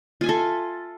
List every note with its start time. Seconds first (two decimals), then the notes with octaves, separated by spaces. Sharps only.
0.21 F4
0.24 G#5
0.26 E5
0.29 A4